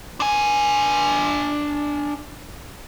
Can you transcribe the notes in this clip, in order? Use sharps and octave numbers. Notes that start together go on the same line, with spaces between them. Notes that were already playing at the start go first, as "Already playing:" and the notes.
D4 G#5